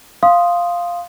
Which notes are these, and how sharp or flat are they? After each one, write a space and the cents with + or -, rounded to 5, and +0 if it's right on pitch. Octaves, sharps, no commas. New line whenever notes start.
F5 +0 C6 +0 D#6 +0